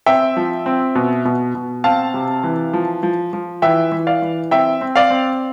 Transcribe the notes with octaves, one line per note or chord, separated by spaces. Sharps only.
C4 E5 G5
F3
C4
B2
B2
B2
C4 F5 A5
C3
E3
F3
F3
F3
E3 E5 G5
E3
D5 F5
E3
C4 E5 G5
C4
D5 F5
C4